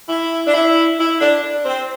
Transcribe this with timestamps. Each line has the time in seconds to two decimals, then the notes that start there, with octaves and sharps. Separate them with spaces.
0.09 E4
0.46 D4
0.54 E4
0.98 E4
1.21 D4
1.65 C4